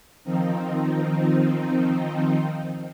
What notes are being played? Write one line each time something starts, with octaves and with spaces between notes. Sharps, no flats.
D#3 F3 C4 D#4